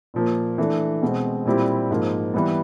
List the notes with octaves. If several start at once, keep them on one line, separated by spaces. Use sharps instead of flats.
A#2 F3 A#3
E3 A3 D4
B2 G#3 C4
A#2 G3 C4 E4 G4
G#2 F3 A#3
E3 G3 B3